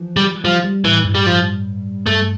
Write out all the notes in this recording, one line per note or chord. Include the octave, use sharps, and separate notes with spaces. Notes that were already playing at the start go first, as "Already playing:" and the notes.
Already playing: E3 F3
G3
F3 G3
G3
A2 E3
G2
G3
F3
G2 A3